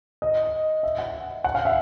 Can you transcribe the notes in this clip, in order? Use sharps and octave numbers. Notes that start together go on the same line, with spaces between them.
D#5
E5
F#5
F#5
F5
E5